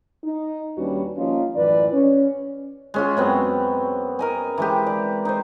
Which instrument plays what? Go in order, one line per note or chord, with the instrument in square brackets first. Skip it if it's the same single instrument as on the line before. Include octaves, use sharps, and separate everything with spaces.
[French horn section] D#4
D#2 G3 C#4 D4 F#4 B4
F3 A#3 C#4 D#4 F4
F#2 A2 E3 B4 D5
C#4
[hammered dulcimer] G#3 C#4 F4
F#2 B3 C4
A#4 D#5 G#5
E3 G#3 G4
D5
D#4 C5